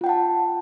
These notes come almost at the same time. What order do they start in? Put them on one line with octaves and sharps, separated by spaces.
F4 G5 F#5 A5